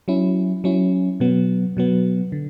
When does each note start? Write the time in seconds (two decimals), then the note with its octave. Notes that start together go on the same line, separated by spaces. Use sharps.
0.08 F#3 C#4 E4
0.64 F#3 C#4 E4
1.20 B2 F#3 B3
1.77 B2 F#3 B3
2.32 D3